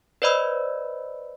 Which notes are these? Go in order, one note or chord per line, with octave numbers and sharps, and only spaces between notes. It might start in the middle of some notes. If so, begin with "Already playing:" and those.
B4 C5 D5 D#5 B5 E6